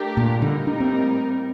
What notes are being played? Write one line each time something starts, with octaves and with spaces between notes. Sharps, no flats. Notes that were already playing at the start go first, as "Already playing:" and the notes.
Already playing: A3 D4 G4 A#4
A#2
A2 D3 G3 A#3 D#4 A#4
D4
C4